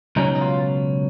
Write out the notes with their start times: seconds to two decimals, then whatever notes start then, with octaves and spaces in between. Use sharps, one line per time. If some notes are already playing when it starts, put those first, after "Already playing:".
0.16 C#2 B2 F#3 C#4 D#4
0.35 D#4
0.41 F4